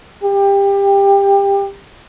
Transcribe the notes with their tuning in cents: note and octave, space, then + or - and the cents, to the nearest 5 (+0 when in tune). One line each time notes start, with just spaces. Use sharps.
G4 +20